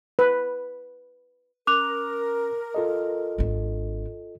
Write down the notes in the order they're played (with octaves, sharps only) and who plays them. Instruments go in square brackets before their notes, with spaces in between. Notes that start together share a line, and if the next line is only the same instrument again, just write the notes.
[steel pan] B4
[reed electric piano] C#4 [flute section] A#4 [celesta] D6 F#6 F7
[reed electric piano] F4 A4 D#5
[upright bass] G#1 D4